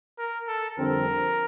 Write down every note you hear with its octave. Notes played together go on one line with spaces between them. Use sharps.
A#4
A4
F2 D3 G3 C4 A#4